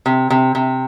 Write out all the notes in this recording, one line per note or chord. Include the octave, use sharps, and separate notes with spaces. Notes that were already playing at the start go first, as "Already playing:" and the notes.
C3
C3
C3